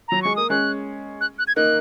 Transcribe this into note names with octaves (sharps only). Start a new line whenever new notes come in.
F#3 A#5
G#3 C#6
A#3 D#6
G#3 C#4 F#6
F#6
F#6
G#6
A#3 D#4 F#6